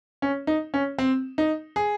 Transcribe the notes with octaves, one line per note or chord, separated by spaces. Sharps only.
C#4
D#4
C#4
C4
D#4
G#4